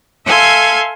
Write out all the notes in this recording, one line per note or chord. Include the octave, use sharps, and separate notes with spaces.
A4 E5 F5 G#5 C6 G#6